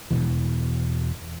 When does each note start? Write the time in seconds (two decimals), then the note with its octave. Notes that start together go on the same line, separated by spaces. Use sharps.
0.11 E1 C2 B2 E3